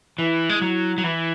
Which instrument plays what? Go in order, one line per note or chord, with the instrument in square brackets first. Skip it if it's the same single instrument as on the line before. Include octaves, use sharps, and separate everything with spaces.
[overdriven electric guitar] E3 [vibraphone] E4
[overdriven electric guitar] G#3
F#3
F#3
E3